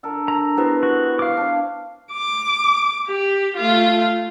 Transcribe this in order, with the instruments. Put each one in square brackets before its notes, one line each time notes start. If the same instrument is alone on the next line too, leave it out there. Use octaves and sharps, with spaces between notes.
[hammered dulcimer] D3 A4 A#4
[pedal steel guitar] A#5
[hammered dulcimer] B3 C4 [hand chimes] E4 G4 B4
[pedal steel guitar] F#4
F5 D6
[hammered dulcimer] D4 C#5
[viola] D6
G4
A3 F4